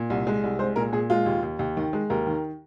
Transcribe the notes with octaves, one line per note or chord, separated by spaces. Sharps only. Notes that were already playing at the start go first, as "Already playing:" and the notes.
Already playing: A#2
C2
G#3
C2
G#3 C5
A#2 A#4
A#2 G#4
G#3 F4
D#2
D#2
D#2
D#3
G#3
D#2 A#4
D#3